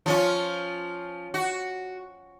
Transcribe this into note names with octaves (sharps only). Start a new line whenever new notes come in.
F3 C#4 F4
F#4